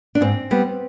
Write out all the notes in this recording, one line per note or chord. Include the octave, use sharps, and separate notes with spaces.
D4
G#2 C4
G3 B3